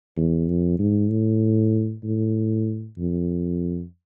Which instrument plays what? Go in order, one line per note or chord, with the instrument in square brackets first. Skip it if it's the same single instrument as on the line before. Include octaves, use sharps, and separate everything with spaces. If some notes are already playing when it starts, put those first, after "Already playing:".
[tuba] E2
F2
G#2
A2
A2
F2